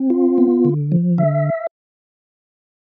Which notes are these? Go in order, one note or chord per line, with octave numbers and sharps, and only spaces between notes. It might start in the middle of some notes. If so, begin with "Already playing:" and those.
Already playing: C4
F4
B3
D3
F3
D3 E5